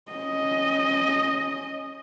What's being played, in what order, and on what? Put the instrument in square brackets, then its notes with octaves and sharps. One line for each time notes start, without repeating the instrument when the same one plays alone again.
[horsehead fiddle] C#4 D#5